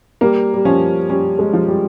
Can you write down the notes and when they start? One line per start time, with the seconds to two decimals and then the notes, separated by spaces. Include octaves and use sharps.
0.21 G3 A#3
0.54 G3
0.65 F3 C#4
1.09 G3 C#4
1.39 G#3
1.53 F3
1.68 G3